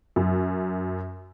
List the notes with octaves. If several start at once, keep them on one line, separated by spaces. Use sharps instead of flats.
F#2